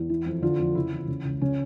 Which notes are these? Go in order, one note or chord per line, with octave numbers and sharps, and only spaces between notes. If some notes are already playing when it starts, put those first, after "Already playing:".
Already playing: E2
E3
F2
D3 F4
F2
C#3 E4
E2
C#3
C#2
C#3 C#4